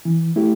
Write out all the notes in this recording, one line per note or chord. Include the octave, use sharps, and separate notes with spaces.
E3
A3 E4 G4